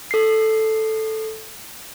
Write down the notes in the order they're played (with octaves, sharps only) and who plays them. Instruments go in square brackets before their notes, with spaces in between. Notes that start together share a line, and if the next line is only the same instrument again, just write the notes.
[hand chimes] A4 C7